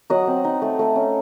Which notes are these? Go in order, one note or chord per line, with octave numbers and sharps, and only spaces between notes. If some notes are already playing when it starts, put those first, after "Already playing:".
F#3 D#5 F#5
C4
D#4
A3
A3
C#4